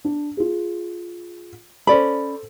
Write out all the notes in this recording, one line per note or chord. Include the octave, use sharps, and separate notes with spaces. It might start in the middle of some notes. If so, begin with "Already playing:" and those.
D4
F4 G#4
C#4 A4 C5 D5 B5